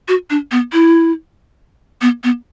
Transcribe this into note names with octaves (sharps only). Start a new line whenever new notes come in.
F#4
D4
B3
E4
B3
B3